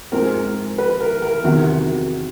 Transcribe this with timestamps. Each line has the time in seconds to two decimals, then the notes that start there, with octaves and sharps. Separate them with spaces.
0.12 G#2 F3 G#3 C4 A#4
0.78 B4
1.00 A#4
1.22 A#4
1.44 E2 C3 D#3 F#3 F#4